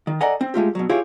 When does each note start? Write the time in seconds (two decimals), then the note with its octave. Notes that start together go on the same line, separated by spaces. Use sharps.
0.07 D#3
0.21 A4 D5 D#5 F#5 G#5 A#5
0.41 C4
0.54 G#3 A3 F4 G4
0.75 B2 F#3
0.89 E4 F4 G4 G#4 C#5